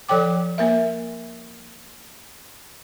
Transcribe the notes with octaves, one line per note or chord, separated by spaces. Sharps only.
F3 A4 C#5 G5 D6
A#3 A#4 E5